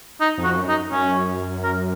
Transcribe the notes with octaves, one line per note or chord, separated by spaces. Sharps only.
D#4
F2
F#4
F#2
D#4
F#2 C#4
A#4